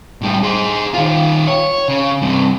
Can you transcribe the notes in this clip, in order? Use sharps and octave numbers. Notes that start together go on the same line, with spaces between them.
A2 G3
G#4 C5
D#3 F4
C#5
C#3
G2 C3